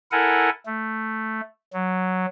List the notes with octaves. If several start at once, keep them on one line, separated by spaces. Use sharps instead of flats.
E4 A4 A#4 F#5 G#5
A3
F#3